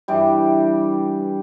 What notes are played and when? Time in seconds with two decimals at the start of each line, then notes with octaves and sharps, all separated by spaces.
0.08 G2 E3 G3 G4